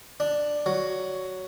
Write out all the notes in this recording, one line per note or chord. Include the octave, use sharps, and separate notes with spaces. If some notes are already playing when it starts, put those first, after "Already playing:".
D4
F#3